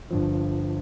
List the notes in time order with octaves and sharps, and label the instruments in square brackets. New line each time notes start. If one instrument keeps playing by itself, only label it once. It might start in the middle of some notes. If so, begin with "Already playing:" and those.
[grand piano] G1 G2 F3